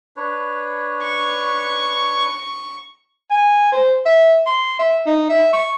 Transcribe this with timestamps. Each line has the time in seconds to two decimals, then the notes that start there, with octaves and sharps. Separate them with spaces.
0.17 D4 B4 C#5
1.02 C#6
3.30 G#5
3.72 C5
4.05 E5
4.46 C6
4.79 E5
5.06 D#4
5.29 E5
5.53 C#6